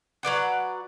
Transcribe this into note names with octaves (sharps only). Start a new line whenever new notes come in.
F#3 B4 D5 F#5